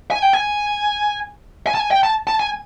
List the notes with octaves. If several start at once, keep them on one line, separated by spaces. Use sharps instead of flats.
G#5
G5
G#5
G#5
A5
G#5
G5
A5
A5
G#5